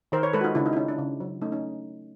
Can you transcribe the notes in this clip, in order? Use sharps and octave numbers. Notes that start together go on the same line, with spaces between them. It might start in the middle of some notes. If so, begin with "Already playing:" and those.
D#3 A#4 C5
B4 C#5
G#3 A4 B4
F#4
D#4 F4
C#3 D4 E4
D#4 F4
E4
C#4 D#4
D4
C#3
F#3
A3 C#4 D#4
C#4 D#4